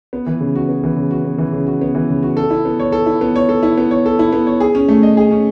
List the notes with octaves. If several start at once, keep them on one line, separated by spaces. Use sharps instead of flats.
B3
E3
C#3
F#4
B3
E3
C#3
F#4
B3
E3
C#3
F#4
B3
E3
C#3
F#4
A4
E4
B3
C#5
A4
E4
B3
C#5
A4
E4
B3
C#5
A4
E4
B3
C#5
G#4
C#4
A3
D#5
G#4
C#4